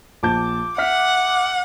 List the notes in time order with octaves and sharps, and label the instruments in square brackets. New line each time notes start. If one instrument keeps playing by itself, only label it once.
[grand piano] A#1 A5 G6 [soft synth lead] D6
[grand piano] E5 F6 B6 [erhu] F#5